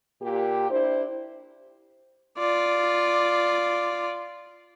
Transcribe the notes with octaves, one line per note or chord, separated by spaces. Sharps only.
A#2 G4
D4 E4 C5
F4 D5